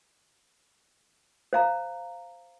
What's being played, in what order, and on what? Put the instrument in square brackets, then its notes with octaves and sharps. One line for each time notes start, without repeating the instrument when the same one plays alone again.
[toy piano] C5 F5 A#5